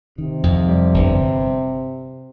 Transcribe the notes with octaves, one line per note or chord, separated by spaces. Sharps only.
C3 D#3
F2
G3
G1